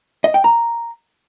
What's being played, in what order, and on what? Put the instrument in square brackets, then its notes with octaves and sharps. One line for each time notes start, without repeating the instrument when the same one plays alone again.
[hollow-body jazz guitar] D#5
G5
A#5